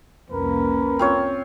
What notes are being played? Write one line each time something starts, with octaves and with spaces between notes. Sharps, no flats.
C2 F2 A#3 C#4 A#4 B4
C4 F4 C#5